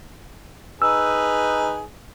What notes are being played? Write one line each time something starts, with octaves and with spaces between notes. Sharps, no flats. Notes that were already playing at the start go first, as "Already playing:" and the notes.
D#4 G#4 B4 E6